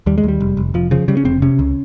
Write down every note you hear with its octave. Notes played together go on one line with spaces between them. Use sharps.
D#2 G3
G#3
D#2
G3
F1
F1
F1 F3
C#3 F3
C#3 G3
C#4
F1 C4
C3 C#4
C#2